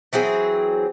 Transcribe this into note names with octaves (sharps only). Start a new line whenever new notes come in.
E3 F#3 C4 G#4